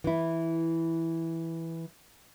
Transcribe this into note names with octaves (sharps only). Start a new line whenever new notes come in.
E3 E4